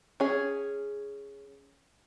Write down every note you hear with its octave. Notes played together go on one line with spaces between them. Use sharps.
C#4 G#4